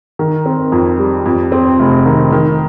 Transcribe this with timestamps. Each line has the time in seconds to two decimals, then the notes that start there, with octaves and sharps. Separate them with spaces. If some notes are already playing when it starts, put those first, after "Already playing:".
0.19 D#3
0.46 C4
0.72 F2
0.99 G3
1.26 F2
1.52 C4
1.80 F1
2.06 D#3
2.32 D#3